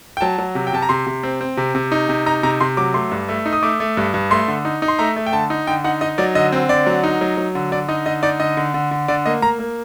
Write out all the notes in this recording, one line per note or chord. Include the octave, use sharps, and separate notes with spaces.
G5
F#3 A5
F#3
C3
G5
C3 A5
A#5
C3 C6
C3
C4
C4
C3
C3
D#4
C3
D#4 A#5
C3 A#5
C3 C6
F#3 D6
A3 C6
G2
A3
D#4
D#6
A3 D6
A3
G2
G2
A3 C6
D3
D#4
D#4
C6
A3 A#5
A3
G5
D3 A5
D#4
D3 G5
D#4 F#5
D#4 D#5
F#3 D5
D3 D#5
C4
D3 D5
F#3
D#4
F#3
F#3
D3
D3 D5
D#4 D#5
D3 D#5
D#4 D5
D3 D#5
D3
D3
D3
D3 D5
A#3 D#5
A#3 A#5
A#3